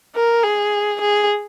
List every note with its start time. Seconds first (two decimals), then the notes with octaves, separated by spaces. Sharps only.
0.15 A#4
0.44 G#4
1.01 G#4